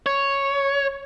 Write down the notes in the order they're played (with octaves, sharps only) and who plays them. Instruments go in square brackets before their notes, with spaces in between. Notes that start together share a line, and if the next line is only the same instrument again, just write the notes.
[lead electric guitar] C#5